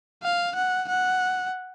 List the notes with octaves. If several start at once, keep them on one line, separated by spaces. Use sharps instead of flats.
F5
F#5
F#5